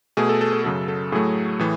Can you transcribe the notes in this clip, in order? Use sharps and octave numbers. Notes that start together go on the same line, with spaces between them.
B2 A3 G#4
A4
A4
A4
F#2 C#3 F#3 A4
A4
A2 F#3 A3 G#4
A2 E3